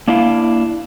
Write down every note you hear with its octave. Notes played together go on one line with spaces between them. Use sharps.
A#3 D4 E4 F5